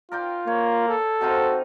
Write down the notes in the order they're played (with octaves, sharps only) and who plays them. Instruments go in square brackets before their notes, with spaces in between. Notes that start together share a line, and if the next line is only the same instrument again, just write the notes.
[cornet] F4 [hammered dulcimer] A#4 D5 G5
[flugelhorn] A#3 [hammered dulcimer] C#5
[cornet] A4
[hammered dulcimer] C3 D#4 F4 [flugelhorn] F#4